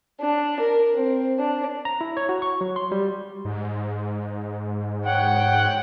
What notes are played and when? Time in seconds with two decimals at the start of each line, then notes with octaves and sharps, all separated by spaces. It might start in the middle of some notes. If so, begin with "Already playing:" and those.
0.20 D4
0.59 A#4
0.95 C4
1.38 D4
1.85 A#5
2.01 E4
2.17 C#5
2.29 F#4
2.42 C#6
2.61 F#3
2.76 C6
2.92 G3
3.45 G#2
5.06 C#5 F#5 G5